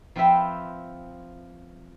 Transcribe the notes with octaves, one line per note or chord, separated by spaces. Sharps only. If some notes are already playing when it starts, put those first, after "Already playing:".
F3 C4 F4 B4 E5 G5